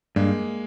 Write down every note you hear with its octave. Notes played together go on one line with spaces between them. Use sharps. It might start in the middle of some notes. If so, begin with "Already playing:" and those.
G2 G#3 A#3